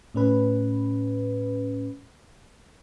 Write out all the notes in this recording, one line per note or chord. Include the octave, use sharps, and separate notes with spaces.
A2 C#4 B4